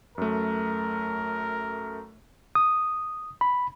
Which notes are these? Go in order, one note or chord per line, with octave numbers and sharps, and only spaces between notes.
F#2 A3 A#4
D#6
B5